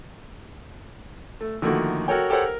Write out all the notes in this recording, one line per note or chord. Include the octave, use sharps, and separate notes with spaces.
A3
D3 D#3 F3 A3 A#3 F#4
F#4 A4 A#4 C#5 G5
G4 A4 A#4 C5 C#5 F#5
A#4